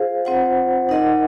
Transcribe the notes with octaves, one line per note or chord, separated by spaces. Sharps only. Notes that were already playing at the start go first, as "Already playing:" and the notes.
Already playing: F4 G#4 C5 F5
C4 F4 C5 F#5
D#4 A#4 D#5 F#5